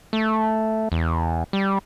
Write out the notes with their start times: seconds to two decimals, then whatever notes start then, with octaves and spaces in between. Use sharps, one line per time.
0.13 A3
0.92 E2
1.53 G3